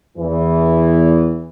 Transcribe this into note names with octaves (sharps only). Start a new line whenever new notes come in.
E2 E3